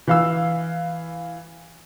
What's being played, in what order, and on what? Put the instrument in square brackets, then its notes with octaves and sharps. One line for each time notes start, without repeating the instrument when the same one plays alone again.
[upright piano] E3 F5 E6